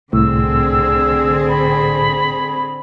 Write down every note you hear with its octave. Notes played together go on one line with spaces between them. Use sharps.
C2 A2 D3 C4 G#4 E6
B5